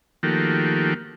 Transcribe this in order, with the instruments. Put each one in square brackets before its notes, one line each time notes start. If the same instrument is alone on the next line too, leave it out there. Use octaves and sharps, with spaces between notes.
[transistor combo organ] D#3 F3 A3 A#3 F#4 G4